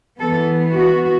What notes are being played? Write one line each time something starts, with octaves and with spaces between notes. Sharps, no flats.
E3 B3 A4
F#4